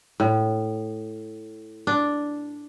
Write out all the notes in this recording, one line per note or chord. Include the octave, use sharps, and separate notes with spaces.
A2
D4